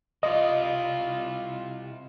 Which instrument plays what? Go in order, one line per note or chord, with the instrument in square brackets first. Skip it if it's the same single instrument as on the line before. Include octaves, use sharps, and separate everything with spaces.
[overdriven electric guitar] C3 E4 [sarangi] F4 [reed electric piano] D#5